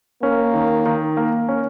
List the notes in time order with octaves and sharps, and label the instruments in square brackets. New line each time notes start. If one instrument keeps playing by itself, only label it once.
[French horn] A#3 [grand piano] C#4
[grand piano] D#3
D#3
A#3
C#4